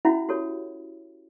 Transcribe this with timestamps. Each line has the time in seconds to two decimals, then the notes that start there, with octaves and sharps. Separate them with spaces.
0.05 C#4 E4 F#4 E5 F#5 B5
0.29 F#4 G4 A4 C#5